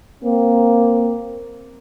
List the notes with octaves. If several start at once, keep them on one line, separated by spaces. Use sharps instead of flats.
A#3 C4